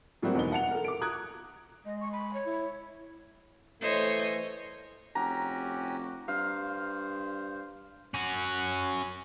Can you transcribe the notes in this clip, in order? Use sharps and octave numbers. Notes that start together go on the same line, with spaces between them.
A2 F#3 G3 A#3 C4 F#4
E2 B2 B3 D#4 G7
F#5 A5 C#7 F7
A4 A#4
D6 D7
A#5 D#6 F#6 G#6
G#3 D#5
C#6
B5
C#5
E4
E3 A3 C5 C#5 D#5
F1 C#4 F#4 G4 A#5
G2 C5 F5
C#4 F#4